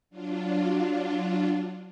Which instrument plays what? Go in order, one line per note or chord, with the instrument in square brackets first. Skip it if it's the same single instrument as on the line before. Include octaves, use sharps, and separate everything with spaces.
[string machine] F#3 D4 F4